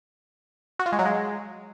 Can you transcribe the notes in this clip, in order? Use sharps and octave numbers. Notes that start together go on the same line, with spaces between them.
F#4
F4
G#3
F#3
G#3